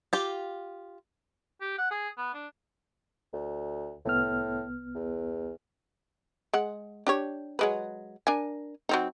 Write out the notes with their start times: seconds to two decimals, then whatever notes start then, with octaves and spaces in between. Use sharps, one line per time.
0.13 F4 G4
1.61 G4
1.78 F#5
1.91 G#4
2.18 B3
2.34 D4
3.33 D2
4.05 C2 A2 B3 F6
4.95 E2
6.53 G#3 F#5
7.07 D4 G4 C#5
7.59 F#3 G#3 B4
8.27 D4 A#4 G#5
8.89 F#3 C4 D#4